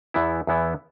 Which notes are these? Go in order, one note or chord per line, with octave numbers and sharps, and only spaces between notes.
E2 E3 B3 E4
E2 E3 B3 E4